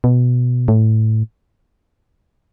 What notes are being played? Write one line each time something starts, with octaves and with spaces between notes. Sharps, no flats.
B2
A2